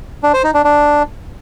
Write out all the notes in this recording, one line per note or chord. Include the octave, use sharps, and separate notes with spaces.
D4
C5
D#4
D4
D4